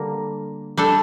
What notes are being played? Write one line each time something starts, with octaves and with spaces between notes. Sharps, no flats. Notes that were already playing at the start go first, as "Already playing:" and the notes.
Already playing: D3 G3 A#3
G3 D4 A4